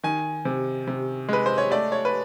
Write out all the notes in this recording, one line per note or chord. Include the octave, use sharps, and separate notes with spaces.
D#3 G#5
C3
C3
G#3 B4
C5
C#5
A3 D5
C#5
B4